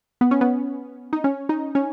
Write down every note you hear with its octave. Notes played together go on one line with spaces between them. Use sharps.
B3
C#4
B3
D#4
C#4
D#4
C#4